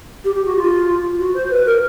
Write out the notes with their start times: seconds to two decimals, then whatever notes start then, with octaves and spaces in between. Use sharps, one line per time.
0.24 G4
0.35 G4
0.45 F#4
0.56 F4
1.19 F#4
1.34 C5
1.50 B4
1.66 A#4